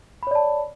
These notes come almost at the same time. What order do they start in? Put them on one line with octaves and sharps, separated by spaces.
B5 C#5 D5 A5